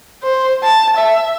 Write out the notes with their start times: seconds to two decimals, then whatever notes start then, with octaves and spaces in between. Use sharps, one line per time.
0.23 C5
0.63 A5
0.97 E5